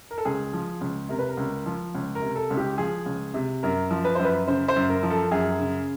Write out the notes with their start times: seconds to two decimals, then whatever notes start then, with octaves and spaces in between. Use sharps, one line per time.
0.11 A#4
0.18 A4
0.25 C#2 G#4
0.53 F3
0.81 C#2
1.09 C3 A#4
1.19 B4
1.29 A#4
1.37 C#2
1.66 F3
1.95 C#2
2.15 A#4
2.22 C3
2.36 A4
2.51 C#2
2.57 G4
2.78 F3 G#4
3.06 C#2
3.34 C3
3.63 F#2 A#4
3.91 F3
4.05 B4
4.15 F#2 C5
4.24 B4
4.48 C#3 C5
4.68 C5
4.76 F#2
4.89 A#4
5.03 F3
5.10 A4
5.31 F#2 G#4
5.60 C#3